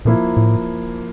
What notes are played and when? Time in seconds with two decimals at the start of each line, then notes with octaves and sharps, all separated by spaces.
0.05 A#2 F3 A#3 E4
0.37 A2